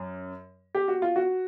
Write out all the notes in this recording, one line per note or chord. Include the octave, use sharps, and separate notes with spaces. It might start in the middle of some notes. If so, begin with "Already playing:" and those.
Already playing: F#2
G4
F#4
F4
F#4